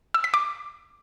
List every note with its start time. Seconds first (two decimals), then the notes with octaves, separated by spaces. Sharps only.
0.14 E6
0.24 B6
0.34 D6